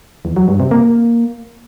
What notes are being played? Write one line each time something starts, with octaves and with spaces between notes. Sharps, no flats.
E2
F#3
G2
C3
A#3